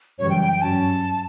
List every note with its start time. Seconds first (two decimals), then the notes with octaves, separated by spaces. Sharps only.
0.19 F#2 C#3 E3 G3 C#5
0.30 G5
0.41 G5
0.52 G5
0.62 G2 F#3 C#4 A5